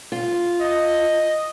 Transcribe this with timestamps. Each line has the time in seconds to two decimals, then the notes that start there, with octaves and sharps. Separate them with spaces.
0.12 F4
0.61 D#5